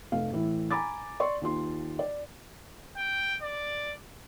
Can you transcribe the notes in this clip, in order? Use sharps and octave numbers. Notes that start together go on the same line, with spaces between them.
F1 A3 F5
A2 E3 E4
G#5 A#5 B5 D6 A6
D5 C6 C#6
D#2 F4 C6
D5
G5
D5